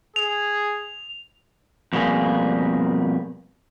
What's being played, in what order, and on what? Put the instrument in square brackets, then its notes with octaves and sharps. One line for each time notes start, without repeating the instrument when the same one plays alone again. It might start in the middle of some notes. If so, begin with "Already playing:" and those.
[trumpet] G#4 [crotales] F7
[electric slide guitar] F2 B2 G3 A#3 G#4